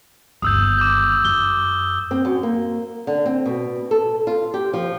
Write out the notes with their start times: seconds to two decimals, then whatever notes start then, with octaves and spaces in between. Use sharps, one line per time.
0.42 G1 D#2 D#6 E6 G6
0.78 D6 G6
1.25 F#2 G7
2.11 C4
2.25 F#2
2.43 A#3
3.07 D3
3.26 C4
3.46 B2
3.91 A4
4.27 F4
4.54 G4
4.73 F3